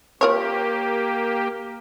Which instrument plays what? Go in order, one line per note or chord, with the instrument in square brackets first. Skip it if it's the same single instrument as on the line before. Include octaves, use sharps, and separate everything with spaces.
[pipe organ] A#3 G4 [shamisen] F4 A#4 C#5